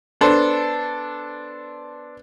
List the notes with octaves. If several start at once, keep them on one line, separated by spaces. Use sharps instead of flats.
B3 D4 A4 C5